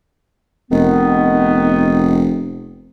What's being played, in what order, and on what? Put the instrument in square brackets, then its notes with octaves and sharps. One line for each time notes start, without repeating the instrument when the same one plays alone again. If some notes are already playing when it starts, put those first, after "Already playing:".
[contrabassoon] F1 [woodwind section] D#3 B3